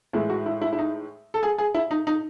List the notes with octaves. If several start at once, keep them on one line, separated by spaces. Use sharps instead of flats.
A2 E3 G#3 E4
F#4
E4
E4
E4
D#4
A4
G#4
G#4
E4
D#4
D#4